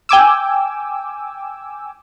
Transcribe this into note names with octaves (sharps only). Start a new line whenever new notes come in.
G5 G#5 D6 E6